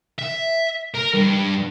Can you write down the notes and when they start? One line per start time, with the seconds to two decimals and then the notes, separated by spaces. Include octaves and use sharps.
0.19 E5
0.95 A#4
1.14 G2